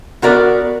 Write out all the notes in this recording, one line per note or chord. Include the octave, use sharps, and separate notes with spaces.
B3 F#4 A#4 D5